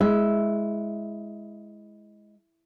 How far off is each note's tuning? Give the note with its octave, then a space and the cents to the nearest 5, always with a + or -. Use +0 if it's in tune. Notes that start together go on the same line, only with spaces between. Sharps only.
G#3 +10 E4 +0 E5 +0